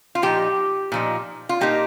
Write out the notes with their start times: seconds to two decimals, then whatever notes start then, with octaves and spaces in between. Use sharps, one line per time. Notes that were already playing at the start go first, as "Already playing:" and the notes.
0.15 F4
0.22 A#2 F3 D#4 G4
0.92 A#2 F3 D#4
1.49 F4
1.61 A#2 A#3 D#4 G4